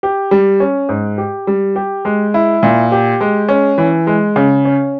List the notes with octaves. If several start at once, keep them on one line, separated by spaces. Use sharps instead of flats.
G4
G3
C#4
G#2
G4
G3
G4
G#3
E4
A#2
G4
G#3
C#4
E3
G#3
C#3
C#4